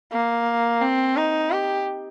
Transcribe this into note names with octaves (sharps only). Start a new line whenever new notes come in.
A#3
C4
D#4
G4